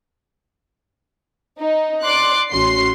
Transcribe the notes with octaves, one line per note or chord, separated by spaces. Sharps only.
D#4
D5 C6 D6 F#6
A1 A2 C#4 F#4 C6 C7